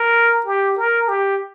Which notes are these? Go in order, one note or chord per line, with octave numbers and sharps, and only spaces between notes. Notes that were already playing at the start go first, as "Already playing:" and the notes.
Already playing: A#4
G4
A#4
G4